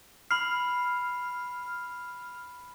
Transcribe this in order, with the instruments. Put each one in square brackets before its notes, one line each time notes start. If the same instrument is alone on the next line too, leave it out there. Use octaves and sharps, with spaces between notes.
[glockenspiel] B5 C7 [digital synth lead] F6